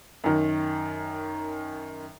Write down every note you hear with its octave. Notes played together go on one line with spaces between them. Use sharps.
F#2 D#3